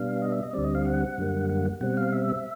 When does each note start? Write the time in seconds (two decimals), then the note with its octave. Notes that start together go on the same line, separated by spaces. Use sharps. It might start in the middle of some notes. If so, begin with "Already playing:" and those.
Already playing: B2 G3 B3 D4 F5
0.22 D#5
0.32 E5
0.43 D#5
0.53 D2 D3 G3 C4 D5
0.64 D#5
0.75 F5
0.85 F#5
1.18 F#2 D3 G3 A#3
1.49 F#5
1.81 B2 G3 C4 F#5
1.97 F5
2.12 E5